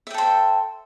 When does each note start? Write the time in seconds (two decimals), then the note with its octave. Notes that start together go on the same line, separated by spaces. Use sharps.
0.07 E5
0.11 G5
0.14 A4
0.18 C5